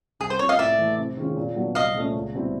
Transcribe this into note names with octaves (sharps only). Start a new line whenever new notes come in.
C2 G#4
C5
C3 F3 C#5
D#5 F5
A2 D5 E5
E3 A3
C3
D#3 G#3 C#4 F4
A#2
F#3 B3 D4
C2 D#5 F5
A#2 F3 A3 C#4
C#2
B2 G3 C4 E4